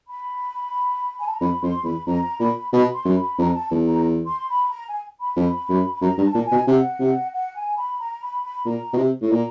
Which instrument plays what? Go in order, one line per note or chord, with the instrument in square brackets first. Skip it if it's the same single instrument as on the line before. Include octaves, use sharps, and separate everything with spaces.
[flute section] B5
G#5
A5
A#5
[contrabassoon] F2 [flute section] B5
[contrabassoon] F2 [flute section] C6
[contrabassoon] E2 [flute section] B5
[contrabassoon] F2 [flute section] A#5
[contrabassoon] A#2 [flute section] B5
[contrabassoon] B2 [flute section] B5
[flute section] C6
[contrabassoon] F#2
[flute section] B5
[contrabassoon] F2 [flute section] A#5
[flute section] A5
[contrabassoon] E2
[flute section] A#5
C6
B5
A#5
G#5
B5
[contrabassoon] F2
F#2
[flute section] B5
[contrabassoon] F#2 [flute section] A#5
[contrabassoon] G2
[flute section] A5
[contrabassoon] A#2
[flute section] G#5
[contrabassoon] B2
[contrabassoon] C3 [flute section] F#5
[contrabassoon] C3
[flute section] F#5
G#5
B5
A#5
B5
B5
[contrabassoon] A#2 [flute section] A#5
[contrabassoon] B2
C3
A2
[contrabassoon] A#2 [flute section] A#5